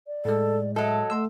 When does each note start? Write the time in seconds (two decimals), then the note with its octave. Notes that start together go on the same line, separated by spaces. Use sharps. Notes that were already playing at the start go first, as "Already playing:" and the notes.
0.07 D5
0.25 A2 G#3 A4
0.76 F#3 A4 D#5 E5
1.10 A3 F#5 C6 E6